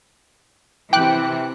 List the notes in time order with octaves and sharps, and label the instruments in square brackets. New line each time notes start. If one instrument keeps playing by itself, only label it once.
[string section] C3 E3 [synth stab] G5 D6 F#6